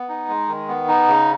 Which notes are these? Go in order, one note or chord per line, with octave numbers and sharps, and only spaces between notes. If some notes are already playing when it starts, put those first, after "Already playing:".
Already playing: B3
D#4
G#3
D#3
B3
D#4
C#3